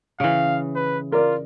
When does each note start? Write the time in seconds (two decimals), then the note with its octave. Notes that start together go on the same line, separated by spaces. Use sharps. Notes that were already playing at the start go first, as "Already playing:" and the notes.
0.20 C#3 E3 F5
0.76 B4
1.12 F4 A#4 D5